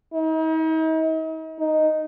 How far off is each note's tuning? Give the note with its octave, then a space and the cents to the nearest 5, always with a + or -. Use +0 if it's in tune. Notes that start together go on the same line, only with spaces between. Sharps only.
D#4 +40
D#4 +0